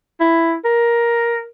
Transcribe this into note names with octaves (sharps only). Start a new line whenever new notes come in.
E4
A#4